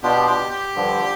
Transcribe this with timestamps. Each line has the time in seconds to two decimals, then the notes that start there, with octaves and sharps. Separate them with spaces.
0.02 B2 B3 D4 F4 G4
0.26 G4
0.51 G4
0.75 G2 D3 F3